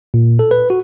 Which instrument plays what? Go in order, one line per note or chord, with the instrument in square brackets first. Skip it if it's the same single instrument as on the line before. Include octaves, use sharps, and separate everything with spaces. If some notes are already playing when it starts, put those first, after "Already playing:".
[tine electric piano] A#2
A4
B4
F#4